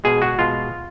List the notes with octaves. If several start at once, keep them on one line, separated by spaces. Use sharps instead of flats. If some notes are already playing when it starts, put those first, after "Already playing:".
B2 G#3 G#4
F#4
B2 G#3 F4